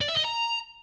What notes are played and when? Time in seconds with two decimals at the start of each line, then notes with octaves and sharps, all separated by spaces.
0.01 D5
0.09 E5
0.17 D#5
0.25 A#5